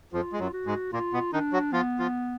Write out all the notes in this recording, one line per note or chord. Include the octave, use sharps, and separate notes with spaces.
F2 F3 F4
G#3
F#2 F#3
F#4
G#2 G#3
A#2 A#3 F4
B2 B3
D#3 D4 D#4
F#3 F#4
F3 B3 F4
F3 F4